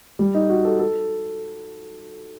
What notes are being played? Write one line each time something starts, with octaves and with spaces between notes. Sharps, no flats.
G3
D#4
F#4
A4
A4